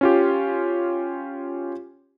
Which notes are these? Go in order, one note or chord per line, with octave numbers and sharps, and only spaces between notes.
C#4 F4 G4